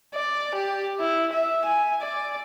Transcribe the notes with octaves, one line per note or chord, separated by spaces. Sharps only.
D5
G4
E4
E5
G#5
D5